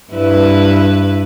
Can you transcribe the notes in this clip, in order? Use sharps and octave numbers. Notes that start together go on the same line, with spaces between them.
G2 E4 B4